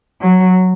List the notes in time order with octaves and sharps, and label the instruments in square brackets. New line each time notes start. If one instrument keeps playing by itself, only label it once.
[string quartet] F#3